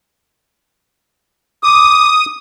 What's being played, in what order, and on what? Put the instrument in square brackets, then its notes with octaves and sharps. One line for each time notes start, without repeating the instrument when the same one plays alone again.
[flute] D6 [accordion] D#6